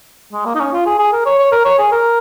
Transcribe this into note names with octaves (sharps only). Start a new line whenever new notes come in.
G#3
A#3
D#4
C#4
F4
G#4
G#4
A#4
C#5
C#5
A#4
C#5
G#4
A#4